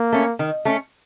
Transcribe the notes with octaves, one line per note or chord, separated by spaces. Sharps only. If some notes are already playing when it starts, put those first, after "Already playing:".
Already playing: A#3
A3 C#4
D#3
A3 C#4